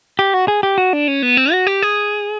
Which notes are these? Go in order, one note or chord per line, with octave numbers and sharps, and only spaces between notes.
G4
F#4
G#4
G4
F#4
D4
C#4
B3
C4
F#4
G4
G#4